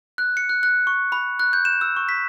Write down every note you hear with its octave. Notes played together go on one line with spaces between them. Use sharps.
F#6
C#7
F#6
F#6
C#6
B5
F#6
G6
E7
E6
C#6
B6